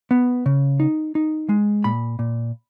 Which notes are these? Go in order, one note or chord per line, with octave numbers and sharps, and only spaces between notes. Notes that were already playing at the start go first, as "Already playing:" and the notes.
B3
C#3
D#4
D#4
G#3
A#2 B5
A#2